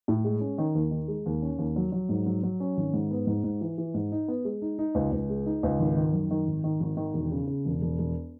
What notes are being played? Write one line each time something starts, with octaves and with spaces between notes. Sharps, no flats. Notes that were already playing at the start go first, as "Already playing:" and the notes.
A2
G#3
C#4
D#3
D#2
D#3
G#3
D#2
C#4
D#2
F#3
F#3
G#2
F#3
F#3
C#4
G#1
G#2
B3
G#2
G#2
E3
E3
G#2
D#4
B3
G#3
D#4
D#4
C#2
C#2
G#3
D#4
C#2
G#1
D#3
F#2
D#3
G#1
D#3
G#1
D#3
E1
C#3
C#3
E1
E1
E1